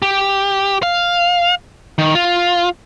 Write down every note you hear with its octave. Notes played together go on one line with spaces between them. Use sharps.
G4
F5
D#3
F4